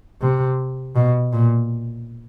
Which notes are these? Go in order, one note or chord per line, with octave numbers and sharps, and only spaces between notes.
C3
B2
A#2